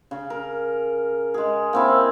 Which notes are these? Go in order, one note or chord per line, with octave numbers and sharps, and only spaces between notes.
C#3
A#4
G#3 G#4
A#3 C4 E4